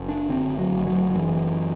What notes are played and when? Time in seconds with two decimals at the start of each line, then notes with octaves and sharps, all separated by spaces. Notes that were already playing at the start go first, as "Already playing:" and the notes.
Already playing: F#1
0.09 D4
0.29 D3 C4
0.59 F#3
0.73 F#1
0.87 F#3
1.10 F#3
1.15 F#2 E3